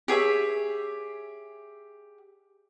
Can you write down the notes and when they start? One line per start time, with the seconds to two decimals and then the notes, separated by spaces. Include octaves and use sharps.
0.08 G4 G#4 C#5 E5